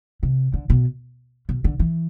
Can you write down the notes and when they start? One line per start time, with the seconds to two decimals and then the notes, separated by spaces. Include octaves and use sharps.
0.23 C3
0.54 D3
0.70 B2
1.49 B2
1.64 D3
1.79 E3